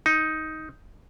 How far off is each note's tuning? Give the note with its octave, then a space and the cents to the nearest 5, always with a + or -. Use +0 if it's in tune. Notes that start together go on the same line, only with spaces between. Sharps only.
D#4 +10